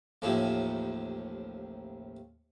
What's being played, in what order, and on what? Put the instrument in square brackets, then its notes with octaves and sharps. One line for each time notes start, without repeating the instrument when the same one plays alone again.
[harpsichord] A1 D#2 C3 F3